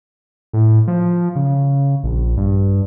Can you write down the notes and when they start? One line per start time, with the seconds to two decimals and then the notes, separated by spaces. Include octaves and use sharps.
0.53 A2
0.87 F3
1.36 C#3
2.03 A#1
2.37 G2